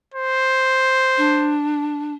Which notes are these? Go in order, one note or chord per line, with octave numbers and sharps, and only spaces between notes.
C5
D4